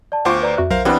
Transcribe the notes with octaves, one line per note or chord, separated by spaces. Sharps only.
D5 A5
D2 B3 F4 C5 F5 G5 C#6 D6
B4 D5 A#5
F2 F#4 E5 F#6
B1 A#4 C5 F5
E3 G3 B3 C4 D4 D5